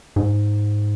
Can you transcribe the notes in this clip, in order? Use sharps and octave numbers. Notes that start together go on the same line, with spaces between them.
G#2